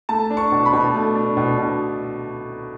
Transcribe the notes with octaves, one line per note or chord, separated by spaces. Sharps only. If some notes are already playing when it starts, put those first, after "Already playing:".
A3 A5
D4
C#6
B2
B5
B2
A3
D4
B2
B2